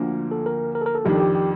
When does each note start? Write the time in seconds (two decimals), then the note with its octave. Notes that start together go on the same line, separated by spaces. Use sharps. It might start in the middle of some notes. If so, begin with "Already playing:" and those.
Already playing: D2 D3 F3 A#3
0.31 A4
0.46 A#4
0.75 A#4
0.81 A4
0.86 A#4
0.95 A4
1.05 F2 D#3 G3 D4 G4
1.15 A4
1.20 G4
1.35 G4